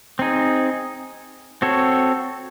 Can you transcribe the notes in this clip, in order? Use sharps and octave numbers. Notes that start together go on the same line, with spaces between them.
C4 D#4 G#4
C4 F#4 A4 C#5